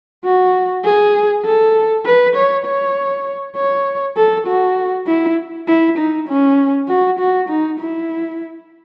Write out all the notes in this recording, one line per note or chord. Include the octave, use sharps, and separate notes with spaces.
F#4
G#4
A4
B4
C#5
C#5
C#5
A4
F#4
E4
E4
D#4
C#4
F#4
F#4
D#4
E4